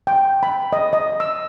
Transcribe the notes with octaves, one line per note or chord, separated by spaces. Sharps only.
G5
B5
D#5
D#5
E6